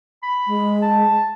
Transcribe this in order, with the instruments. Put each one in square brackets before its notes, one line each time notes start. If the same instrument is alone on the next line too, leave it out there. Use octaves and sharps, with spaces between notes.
[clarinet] B5
[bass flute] G#3
[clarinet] A5